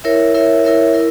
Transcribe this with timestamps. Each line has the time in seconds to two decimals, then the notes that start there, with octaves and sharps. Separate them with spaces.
0.04 E4 A#4 C#5 E5
0.34 E4 A#4 C#5 E5
0.64 E4 A#4 C#5 E5
0.94 E4 A#4